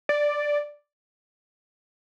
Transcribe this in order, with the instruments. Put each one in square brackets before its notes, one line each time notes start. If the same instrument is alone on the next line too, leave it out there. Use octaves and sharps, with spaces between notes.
[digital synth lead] D5